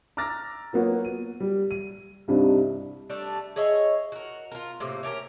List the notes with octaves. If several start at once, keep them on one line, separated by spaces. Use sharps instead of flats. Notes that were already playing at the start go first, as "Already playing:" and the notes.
A#5 D6 E6 F6 A6 A#6
F#3 A#3 B3 F4 C#5
D#7
G3
D#7
C2 G2 C3 D4 D#4
G3 A3 D4
G#4 C#5 D#5 E5
F#4 A#4
F4 A#4
A2 C3 A#3
C#4 G4 A4 A#4